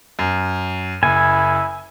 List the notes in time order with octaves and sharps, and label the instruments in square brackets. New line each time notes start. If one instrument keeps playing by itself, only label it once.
[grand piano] F#2
[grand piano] F#1 [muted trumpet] E4 [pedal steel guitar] G#5